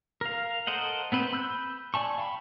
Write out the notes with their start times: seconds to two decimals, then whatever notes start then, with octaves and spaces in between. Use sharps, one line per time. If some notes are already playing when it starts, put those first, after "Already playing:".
0.21 A#4 F5
0.67 A4 A#4 C5 D#5 F#5
1.12 B3 C4 B4 C5
1.33 B5 E6 F#6 G6
1.94 D5 G#5 A5 C#6
2.18 F5 G5 B5